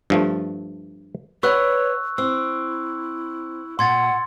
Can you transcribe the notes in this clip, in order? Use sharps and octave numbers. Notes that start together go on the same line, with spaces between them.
G2 F3 A3
B4 C#5 D5 F#5 C#6 E6 F#6
C4 E4 E6
A#2 F#5 C6 G#6 A6